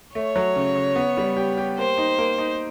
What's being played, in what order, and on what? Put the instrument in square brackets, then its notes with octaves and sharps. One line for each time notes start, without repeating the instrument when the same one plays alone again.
[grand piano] A3 [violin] C#5
[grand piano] F#3
C#3
C#3
B3
G3
G4
G4
[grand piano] A#3 [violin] C5
[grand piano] D#4
A#3
D#4